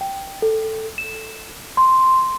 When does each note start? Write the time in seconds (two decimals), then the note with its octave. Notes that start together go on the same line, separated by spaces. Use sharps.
0.01 G5
0.42 A4
0.98 E7
1.77 C6